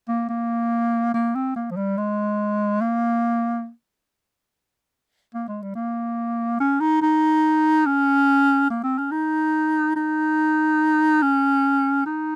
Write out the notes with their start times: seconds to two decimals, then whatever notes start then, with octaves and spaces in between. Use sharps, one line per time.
0.09 A#3
0.29 A#3
1.14 A#3
1.35 C4
1.56 A#3
1.71 F3
1.77 G3
1.97 G#3
2.81 A#3
5.34 A#3
5.48 G#3
5.62 G3
5.75 A#3
6.60 C#4
6.81 D#4
7.02 D#4
7.86 C#4
8.70 A#3
8.83 C4
8.98 C#4
9.12 D#4
9.96 D#4
11.22 C#4
12.06 D#4